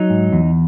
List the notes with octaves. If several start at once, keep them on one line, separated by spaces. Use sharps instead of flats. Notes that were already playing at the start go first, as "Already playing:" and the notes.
Already playing: F#3 D#4
G#2
E2